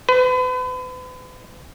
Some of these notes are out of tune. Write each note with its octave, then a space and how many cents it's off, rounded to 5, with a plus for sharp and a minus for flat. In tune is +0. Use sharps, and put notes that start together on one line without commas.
B4 +40